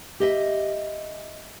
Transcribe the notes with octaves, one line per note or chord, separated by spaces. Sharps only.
G4 D#5 E5